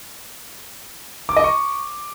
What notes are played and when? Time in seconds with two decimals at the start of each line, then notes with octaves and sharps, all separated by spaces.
1.29 D6
1.37 D#5
1.44 C#6